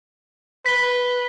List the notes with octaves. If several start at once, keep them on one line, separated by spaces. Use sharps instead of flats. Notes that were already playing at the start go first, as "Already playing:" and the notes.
B4 B6 G7